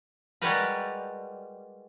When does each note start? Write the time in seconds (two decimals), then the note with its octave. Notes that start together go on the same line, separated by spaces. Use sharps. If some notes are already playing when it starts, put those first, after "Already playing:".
0.42 G3 G#3 F#4 G4 A#4 B4